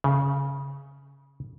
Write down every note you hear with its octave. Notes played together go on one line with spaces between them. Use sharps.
C#3